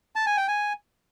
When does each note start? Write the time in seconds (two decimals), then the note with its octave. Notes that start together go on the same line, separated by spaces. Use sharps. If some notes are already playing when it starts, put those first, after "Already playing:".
0.16 A5
0.26 G#5
0.37 G5
0.48 G#5